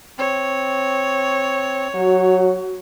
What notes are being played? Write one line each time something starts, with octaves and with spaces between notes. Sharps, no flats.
C4 C#5
F#3 F#4